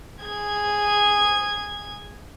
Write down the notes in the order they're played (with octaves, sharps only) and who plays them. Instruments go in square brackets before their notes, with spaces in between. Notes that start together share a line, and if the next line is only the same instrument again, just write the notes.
[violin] G#4 G#6